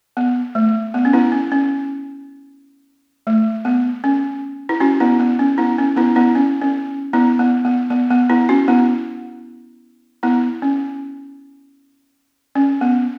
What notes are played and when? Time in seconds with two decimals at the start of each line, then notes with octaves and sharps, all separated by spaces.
0.17 B3
0.55 A3
0.94 B3
1.05 C#4
1.13 B3 E4
1.32 C#4
1.52 C#4
3.27 A3
3.65 B3
4.04 C#4
4.69 E4
4.80 C#4 F#4
5.00 B3 E4
5.20 B3
5.39 C#4
5.58 B3 E4
5.78 C#4
5.96 B3 E4
6.16 B3 E4
6.35 C#4
6.61 C#4
7.13 B3 E4
7.39 B3
7.65 B3
7.90 B3
8.11 B3
8.30 B3 E4
8.49 C#4 F#4
8.68 B3 E4
10.23 B3 E4
10.62 C#4
12.55 C#4
12.81 B3